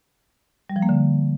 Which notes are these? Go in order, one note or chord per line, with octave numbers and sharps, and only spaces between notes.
G3
F3
A#3
D3